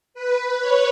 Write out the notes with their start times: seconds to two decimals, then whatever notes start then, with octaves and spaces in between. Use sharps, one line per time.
0.14 B4
0.59 C#5